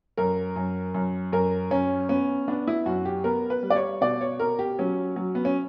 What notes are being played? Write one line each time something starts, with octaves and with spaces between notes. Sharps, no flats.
F#2 A#4
F#2
F#2
F#2 A#4
F#2 C#4
B3 C#4
B3 D4
E4
F#2 F#4
G4
B3 A#4
B4
G3
D5
C#5
B2 D5
C#5
B2 A#4
G4
F#3 C#4
F#3
B3
C#4